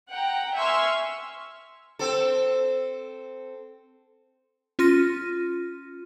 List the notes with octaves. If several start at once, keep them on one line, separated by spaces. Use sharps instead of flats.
F#5 G5 A#5
E5 G#5 C6 C#6 E6 F6
C4 A4
C#4 F4 C6 F6 A#6 D#7